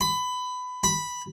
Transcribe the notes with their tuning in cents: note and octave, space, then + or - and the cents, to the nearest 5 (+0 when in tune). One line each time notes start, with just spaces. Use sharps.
B5 +20
B5 -5